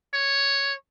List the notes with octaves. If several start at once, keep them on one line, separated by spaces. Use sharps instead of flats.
C#5